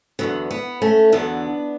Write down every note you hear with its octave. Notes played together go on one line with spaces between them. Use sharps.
E2 D3 F#3 B3
B3
A3 C#4
E2 D3 F#3 B3 D4